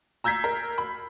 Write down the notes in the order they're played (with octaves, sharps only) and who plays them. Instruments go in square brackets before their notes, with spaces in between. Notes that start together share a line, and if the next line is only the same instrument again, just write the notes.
[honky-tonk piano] A#5 E6 G6 G#6 B6 C7
A#4
B5